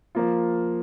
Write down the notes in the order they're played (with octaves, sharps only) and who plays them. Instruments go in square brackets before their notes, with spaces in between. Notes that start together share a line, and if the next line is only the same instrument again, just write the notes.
[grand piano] F3 A#3 F4